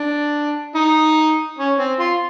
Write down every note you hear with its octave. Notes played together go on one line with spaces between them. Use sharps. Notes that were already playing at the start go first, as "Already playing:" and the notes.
Already playing: D4
D#4
C#4
C4
F4